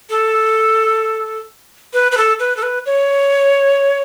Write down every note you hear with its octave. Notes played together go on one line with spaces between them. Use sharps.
A4
B4
B4
A4
B4
A4
B4
C#5